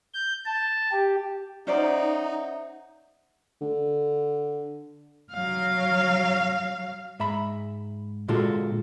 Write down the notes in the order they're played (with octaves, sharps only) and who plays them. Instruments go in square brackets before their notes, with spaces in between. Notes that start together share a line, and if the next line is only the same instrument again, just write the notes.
[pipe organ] G6
A5
G4
[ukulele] C#4 C5 D5 [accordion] D#4 [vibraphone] E5 F#5
[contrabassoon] D3
[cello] F#3 F5
[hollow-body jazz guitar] G#2 E5 A#5 B5
A#2 D3 G#3 F4 F#4 A4